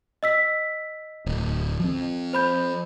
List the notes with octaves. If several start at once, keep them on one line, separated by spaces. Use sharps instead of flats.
D#5 E6 B6
D1
F3 C4
C5 B5 G6